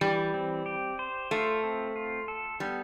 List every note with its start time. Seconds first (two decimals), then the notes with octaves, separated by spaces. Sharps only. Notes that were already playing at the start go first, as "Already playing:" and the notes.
0.01 E3 G3
0.34 C4
0.66 G4
0.99 C5
1.31 A3 F4
1.64 C4
1.96 F4
2.28 A4
2.60 G3 B3